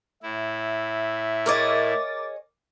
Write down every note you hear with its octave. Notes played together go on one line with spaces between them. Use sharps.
A2 E4 E5
G#4 A#4 C#5 D#5 D6 A6